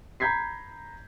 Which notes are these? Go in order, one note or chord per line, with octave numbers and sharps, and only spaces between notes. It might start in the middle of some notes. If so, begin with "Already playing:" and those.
A#5 B5 G6 G#6 B6 C7